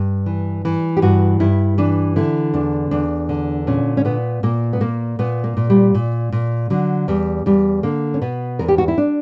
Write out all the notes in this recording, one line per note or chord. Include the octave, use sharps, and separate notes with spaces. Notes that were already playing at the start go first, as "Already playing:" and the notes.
Already playing: G2
E3
E3
G4
G2 F#4
G2 E4
E3 D4
D3 E4
E2 D4
E2 D4
D3
A#2 C#4
C#4
A#2 B3
A#2 A#3
B3
A#2 A#3
A#2 B3
A#3
A#2
G3
A#2
A#2
D3 F#3
E2 G3
E2 G3
D3 A#3
C#4
B2 B3
E2 A#4
G4
F#4
E4
D4